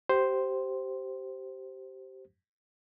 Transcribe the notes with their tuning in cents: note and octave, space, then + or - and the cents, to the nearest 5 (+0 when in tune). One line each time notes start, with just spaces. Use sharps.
G4 -20 C5 +0